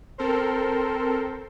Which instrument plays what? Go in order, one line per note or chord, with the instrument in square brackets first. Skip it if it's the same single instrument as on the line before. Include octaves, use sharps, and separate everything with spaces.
[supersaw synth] C4 A4 A#4 C5